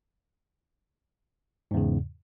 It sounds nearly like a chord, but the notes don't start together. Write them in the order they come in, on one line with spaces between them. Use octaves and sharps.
G#2 E2 C#3